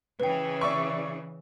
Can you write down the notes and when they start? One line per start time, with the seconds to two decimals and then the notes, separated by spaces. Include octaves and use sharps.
0.20 C#3 E3 B4 G5
0.61 D5 E5 C#6